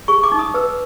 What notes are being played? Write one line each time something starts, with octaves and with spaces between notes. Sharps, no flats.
G#4 C#6
D6
D#4
D#6
B4 E6